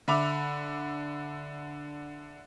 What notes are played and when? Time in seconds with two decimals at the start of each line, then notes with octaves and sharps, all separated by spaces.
0.08 D3 E5 B5 D6 F7